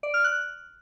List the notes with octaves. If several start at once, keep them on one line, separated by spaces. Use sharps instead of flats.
D5
F6
F#6